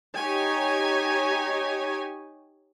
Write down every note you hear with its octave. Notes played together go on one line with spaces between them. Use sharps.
D#4 G4 C#5 G#5